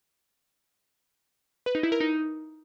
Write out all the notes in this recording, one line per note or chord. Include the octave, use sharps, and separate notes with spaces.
B4
D#4
E4
A#4
D#4